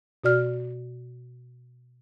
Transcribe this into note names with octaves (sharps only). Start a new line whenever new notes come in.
B2 F#4 D5 F6